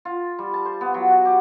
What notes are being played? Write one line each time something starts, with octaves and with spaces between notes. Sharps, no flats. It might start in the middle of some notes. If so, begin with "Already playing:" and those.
F4
G3
A5
C5
B3
F#3
F#4
G4